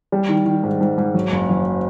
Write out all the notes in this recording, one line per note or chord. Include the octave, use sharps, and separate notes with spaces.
G3
D#3
D#3
G#2
G#2
G#2
F#3
F#1
F#3